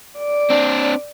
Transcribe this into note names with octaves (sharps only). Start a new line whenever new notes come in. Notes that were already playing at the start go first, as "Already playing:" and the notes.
D5
C4 D4